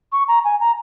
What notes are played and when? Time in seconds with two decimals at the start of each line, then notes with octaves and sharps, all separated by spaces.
0.12 C#6
0.28 A#5
0.44 G#5
0.60 A#5